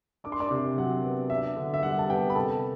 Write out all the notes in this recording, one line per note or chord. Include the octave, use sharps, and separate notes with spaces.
D4 D6
C6
D5 D6
C3
F#3 F#5
B3
D4 E5
D3
E5
G3 F#5
A5
B3 G4 G5
B5
C3 A4 A5